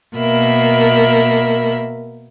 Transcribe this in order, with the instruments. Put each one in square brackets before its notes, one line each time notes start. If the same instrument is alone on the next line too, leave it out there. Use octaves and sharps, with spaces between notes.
[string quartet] B2 A#3 A#4 E5 B5